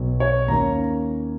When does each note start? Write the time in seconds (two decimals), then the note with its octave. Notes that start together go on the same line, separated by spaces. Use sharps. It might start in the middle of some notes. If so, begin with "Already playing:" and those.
Already playing: B1 B2 F#3 B3
0.20 C#5
0.48 D#2 D#3 A#3 C#4 A#5